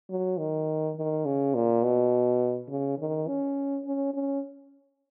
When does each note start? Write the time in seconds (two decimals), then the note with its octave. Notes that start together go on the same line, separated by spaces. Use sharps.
0.09 F#3
0.39 D#3
0.97 D#3
1.25 C#3
1.55 A#2
1.83 B2
2.69 C#3
2.99 D#3
3.27 C#4
3.85 C#4
4.14 C#4